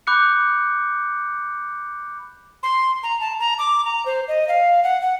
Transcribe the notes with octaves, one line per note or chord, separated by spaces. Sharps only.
B5 D6 F#6 G6 C#7
C6
A#5
A5
A#5
D6
A#5
C5
D#5
F5
F#5
F#5